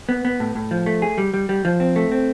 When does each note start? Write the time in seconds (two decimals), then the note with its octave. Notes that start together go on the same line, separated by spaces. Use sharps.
0.09 B3
0.25 B3
0.40 A2
0.55 A2
0.71 F3
0.86 A3
1.02 G#4
1.18 G3
1.34 G3
1.49 G3
1.65 F3
1.80 C4
1.96 A3
2.12 C4